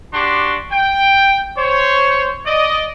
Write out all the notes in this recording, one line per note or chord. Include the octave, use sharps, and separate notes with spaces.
D4 F#4 G4 C6 C#6
G5
C5 C#5
D5 D#5